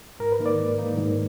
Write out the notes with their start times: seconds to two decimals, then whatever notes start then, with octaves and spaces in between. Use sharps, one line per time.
0.20 G#2 A#4
0.32 B4
0.39 D#3 A#3 D#4
0.46 D5
0.59 G#2
0.78 D#3 A#3 D#4
0.97 G#2